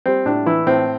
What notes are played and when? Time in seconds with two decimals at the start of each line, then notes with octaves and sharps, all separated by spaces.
0.06 G3 C4
0.26 A2 D4
0.46 E3 E4
0.67 A2 C4